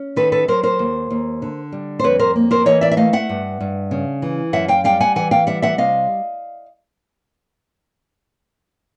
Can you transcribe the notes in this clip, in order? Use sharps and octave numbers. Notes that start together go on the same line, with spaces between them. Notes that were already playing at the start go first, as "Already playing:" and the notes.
Already playing: C#4
D#3 A4 B4
A4 B4
F#3 A#4 C5
A#4 C5
D#2
D#2
D3
G3
C5
F2 B4 C#5
A#4 C5
A#3
A#4 C5
E3 C#5 D#5
D5 E5
E5
A3 D#5 F5
E5 F#5
G2
G2
C#3
E3
F#2 E5 F#5
F5 G5
G3 F5 G5
F#5 G#5
E3 F#5 G#5
F5 G5
G3 E5 F#5
E5 F#5
C3 D#5 F5